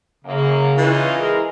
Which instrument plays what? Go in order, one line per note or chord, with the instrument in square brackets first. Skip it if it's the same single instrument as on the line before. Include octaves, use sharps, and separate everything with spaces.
[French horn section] F#2 A#3 [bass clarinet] C#3
[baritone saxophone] E3 [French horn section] C#4 D#4 F4
[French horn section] G#3 G#4 A#4